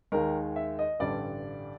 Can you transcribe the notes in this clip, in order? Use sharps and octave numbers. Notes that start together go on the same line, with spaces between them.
D#2 D#3 G#3 A#4
E5
D#5
A1 G2 D3 G3 D5